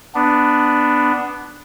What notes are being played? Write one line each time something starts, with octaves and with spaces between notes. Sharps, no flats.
B3 D4